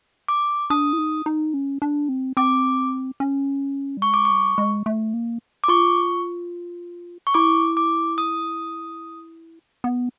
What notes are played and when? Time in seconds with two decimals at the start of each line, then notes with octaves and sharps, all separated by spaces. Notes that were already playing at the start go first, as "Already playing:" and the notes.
0.28 D6
0.70 D4 D#6
0.93 E4
0.98 D#4
1.26 D#4
1.54 C#4
1.82 D4
2.09 C4
2.37 C4 D6
3.20 C#4
3.97 G3
4.02 G#3 C#6
4.14 D6
4.25 C#6
4.30 G3
4.58 G#3
4.86 A3
5.14 A#3
5.64 D6
5.68 F4 C#6
7.27 C#6
7.34 E4 D6
7.77 D6
8.18 D#6
9.84 B3